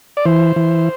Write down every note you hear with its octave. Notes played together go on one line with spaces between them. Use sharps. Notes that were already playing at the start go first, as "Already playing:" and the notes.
D5
E3 C5
E3